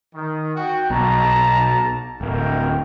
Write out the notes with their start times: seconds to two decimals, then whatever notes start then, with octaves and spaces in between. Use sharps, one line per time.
0.14 D#3
0.56 F#4 G5
0.90 B1 B2 A5 A#5
2.21 D1 F#4 A#4 G5